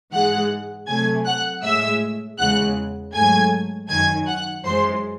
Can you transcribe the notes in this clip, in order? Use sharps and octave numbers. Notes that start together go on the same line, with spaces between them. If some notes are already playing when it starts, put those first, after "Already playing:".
G#2 E3 G#3 F#5 F#6
C3 F#3 A3 G#5 G#6
F#5 F#6
A2 G#3 E5 E6
E2 C#3 E3 G#3 F#5 F#6
G#2 F#3 A3 G#5 G#6
F#2 D#3 F#3 G#5 G#6
F#5 F#6
F#2 E3 G#3 C5 C6